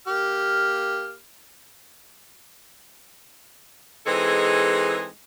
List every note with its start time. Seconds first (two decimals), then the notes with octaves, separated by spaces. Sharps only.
0.07 A#3 G4 F6
4.07 E3 G#3 C4 D#4 G#4 A4